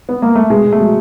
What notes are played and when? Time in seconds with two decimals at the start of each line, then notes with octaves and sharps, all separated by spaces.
0.09 B3
0.22 A#3
0.35 A3
0.50 B2 G#3
0.65 B2
0.72 A3
0.80 F#3